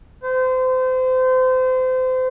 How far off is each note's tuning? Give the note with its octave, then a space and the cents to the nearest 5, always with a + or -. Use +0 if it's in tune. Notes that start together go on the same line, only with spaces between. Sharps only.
C5 -30